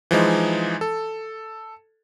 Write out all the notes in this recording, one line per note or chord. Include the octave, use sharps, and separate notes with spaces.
E3 F3 G#3 D#4
A4